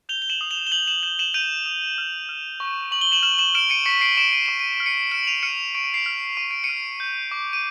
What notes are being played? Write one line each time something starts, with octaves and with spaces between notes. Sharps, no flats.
G6 F7 G7
G7
E7 F#7
D#6
F7 G7
G7
G6 E7 F#7
E7 F#7
G6 E7 F#7
E7 F#7
G6 D#7 F7
D#6
F6
F6
C#6
C#6 F#7
G7
E7 F#7
F6 E7 F#7
E7 F#7
F6 D7 E7
C#7 D#7
C#6 B6 C#7
C7 D7
C#6 D7 E7
D#7
C#6 E7
D#7
E7
F6
C#7 D#7
F6 D7 E7
F#7
D#7 F7
F6 C#7 D#7
C#6 D7
D#7
C7 D7
F6
C#6 D#7
D7
C#7 D#7
F6
G6
D6
D#7